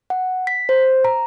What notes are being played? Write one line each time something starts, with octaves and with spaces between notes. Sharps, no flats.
F#5
B6
C5
A#5